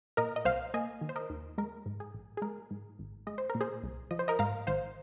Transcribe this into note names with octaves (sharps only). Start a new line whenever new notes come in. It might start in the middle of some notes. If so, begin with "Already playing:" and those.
A#2 A#4 D#5
D#5
C2 C5 F5
A#3 D#5 G#5
D#3
C5
A#4 D#5
D#2
G#3 A#4
G#2
G#4
A#1
G#4
G#3 A#4
G#2
G#1
G#3 D#5
C5
A#2 A#4
G#4 C5
C2
F3 D#5
C5
A#4 D#5
G#2 F5 A#5
G#1 C5 F5